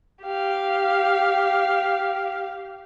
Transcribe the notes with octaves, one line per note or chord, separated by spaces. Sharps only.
G4 F5